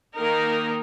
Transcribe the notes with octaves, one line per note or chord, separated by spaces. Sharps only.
D#3 A#3 D#4 A#4